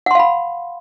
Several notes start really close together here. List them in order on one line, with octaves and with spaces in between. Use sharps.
F#5 C6 F5 B5